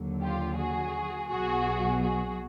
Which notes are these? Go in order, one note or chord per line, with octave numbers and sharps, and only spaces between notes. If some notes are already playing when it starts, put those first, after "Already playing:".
Already playing: D#2 D3 F#3
F4 G4
F#4 G#4
B1 B2 F#3 F#4 G#4
F#4 G#4